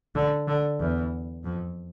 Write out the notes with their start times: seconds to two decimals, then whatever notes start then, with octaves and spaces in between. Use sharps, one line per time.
0.15 D3
0.48 D3
0.80 E2
1.44 F2